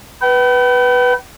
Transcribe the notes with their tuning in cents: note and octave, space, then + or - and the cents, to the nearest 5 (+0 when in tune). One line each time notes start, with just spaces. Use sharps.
B4 +0 G5 -45